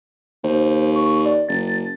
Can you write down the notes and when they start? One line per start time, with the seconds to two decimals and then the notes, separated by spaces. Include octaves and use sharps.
0.44 D#2 C5
0.96 C#6
1.26 D5
1.49 F#1 A6